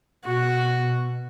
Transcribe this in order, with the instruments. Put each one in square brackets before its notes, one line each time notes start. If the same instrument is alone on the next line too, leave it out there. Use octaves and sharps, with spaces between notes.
[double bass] B2 [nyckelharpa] F#4